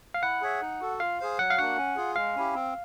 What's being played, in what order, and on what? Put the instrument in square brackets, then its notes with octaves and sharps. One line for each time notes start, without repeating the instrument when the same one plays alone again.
[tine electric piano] F5
[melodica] E4 [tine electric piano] F#5
[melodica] G#4 C#5 E5
D#4
F#4 A4
[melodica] F4 [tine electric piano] F5
[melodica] G#4 C5 F5
[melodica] F#3 [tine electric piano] F#5
[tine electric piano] F5
[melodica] A#3 D4 F#4 [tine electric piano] F#5
[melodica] C#4
F4 G#4
[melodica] G#3 [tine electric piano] F5
[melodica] C#4 E4 G4
C4